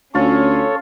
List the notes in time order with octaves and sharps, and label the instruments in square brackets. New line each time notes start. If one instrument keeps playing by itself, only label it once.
[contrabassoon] D2 [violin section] C#4 [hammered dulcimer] F4 [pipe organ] A4 C#5